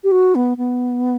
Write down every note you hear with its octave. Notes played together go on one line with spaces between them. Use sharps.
G4
F#4
B3
B3